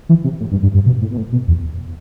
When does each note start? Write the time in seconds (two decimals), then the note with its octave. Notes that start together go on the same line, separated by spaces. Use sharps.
0.09 E3
0.24 C3
0.40 A2
0.52 G2
0.63 G2
0.75 G2
0.86 B2
1.02 A2
1.11 B2
1.18 A2
1.32 B2
1.48 E2